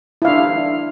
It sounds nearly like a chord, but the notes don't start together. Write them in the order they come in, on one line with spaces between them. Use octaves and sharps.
E4 F5 D4